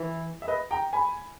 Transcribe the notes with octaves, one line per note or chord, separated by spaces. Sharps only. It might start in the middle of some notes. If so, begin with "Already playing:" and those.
Already playing: E3
E5
B4 D#5
G5 A#5
G#5 B5